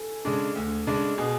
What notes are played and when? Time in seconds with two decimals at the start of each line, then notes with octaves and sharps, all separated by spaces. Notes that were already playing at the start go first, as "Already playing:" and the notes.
Already playing: A4 G#5
0.25 C#3 G#3 D4
0.55 D2
0.87 C#3 G#3 D4
1.18 B2 G#4